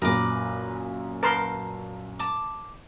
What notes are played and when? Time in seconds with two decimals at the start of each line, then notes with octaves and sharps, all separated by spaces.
0.02 F#2 A#2 A#4 B4 D6
1.23 A#4 B4 A5 C6
2.19 A5 D6